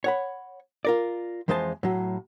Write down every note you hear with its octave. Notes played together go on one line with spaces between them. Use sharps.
C#5 F#5 B5
F4 A#4 D5
F2 E3 G#3 C5 D#5 A5
A2 F#3